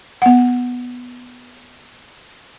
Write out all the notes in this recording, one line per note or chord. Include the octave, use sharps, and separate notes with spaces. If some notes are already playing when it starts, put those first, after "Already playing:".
B3 F#5